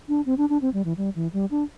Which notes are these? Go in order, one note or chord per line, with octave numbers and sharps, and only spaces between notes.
D4
C4
D4
D4
C4
G3
E3
G3
E3
G3
D4